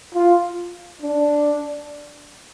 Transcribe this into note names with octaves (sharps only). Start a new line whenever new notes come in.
F4
D4